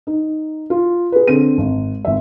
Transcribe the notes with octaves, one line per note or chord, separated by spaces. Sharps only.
D#4
F4
G#4 B4
D3 C4 D#7
G#1
G#1 E5